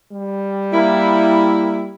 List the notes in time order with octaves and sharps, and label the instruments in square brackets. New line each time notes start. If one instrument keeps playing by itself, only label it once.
[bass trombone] G3
[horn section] A#3 E4